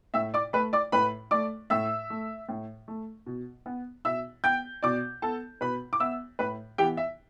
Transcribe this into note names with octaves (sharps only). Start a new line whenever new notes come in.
A2 E5 E6
D5 D6
A3 B4 B5
D5 D6
A2 B4 B5
A3 D5 D6
A2 E5 E6
A3
A2
A3
B2
B3
B2 E5 E6
B3 G5 G6
B2 D5 D6
B3 A4 A5
B2 B4 B5
D6
B3 E5 E6
A2 B4 B5
E3 B3 G4 G5
E5